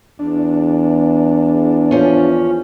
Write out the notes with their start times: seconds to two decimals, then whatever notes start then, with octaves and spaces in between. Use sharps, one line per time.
0.19 E2 D4
1.91 F3 C#4